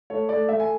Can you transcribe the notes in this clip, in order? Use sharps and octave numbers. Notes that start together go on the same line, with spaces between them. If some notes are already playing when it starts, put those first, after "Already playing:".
A3 C#5
A3 D5
A3 E5
G#5